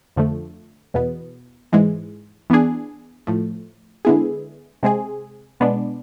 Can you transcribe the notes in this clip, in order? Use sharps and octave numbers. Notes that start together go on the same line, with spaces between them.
F2 D3 F3 A3
E2 B2 B3
G#2 E3 G#3
E3 B3 D4 G#4
A2 F3 A3
D3 G#3 B3 E4 G#4
C3 G#3 C4 G#4
B2 G#3 B3 D4